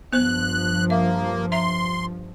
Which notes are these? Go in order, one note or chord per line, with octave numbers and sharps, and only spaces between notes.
G2 F3 B3 C5 F#6
A#3 E5
E5 A#5 C6